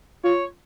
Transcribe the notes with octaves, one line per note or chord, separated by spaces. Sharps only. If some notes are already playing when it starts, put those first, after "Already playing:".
F4 C#5